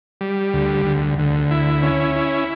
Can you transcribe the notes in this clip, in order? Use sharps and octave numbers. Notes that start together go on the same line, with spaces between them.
G3
D2
D2
D2
E4
C#4
E4